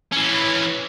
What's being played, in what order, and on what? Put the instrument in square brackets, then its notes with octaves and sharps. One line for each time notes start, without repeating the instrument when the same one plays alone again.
[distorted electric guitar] E3 C#4